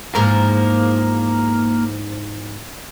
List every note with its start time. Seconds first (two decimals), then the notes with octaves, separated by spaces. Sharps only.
0.15 E2 G#2 F3 A#3 A#4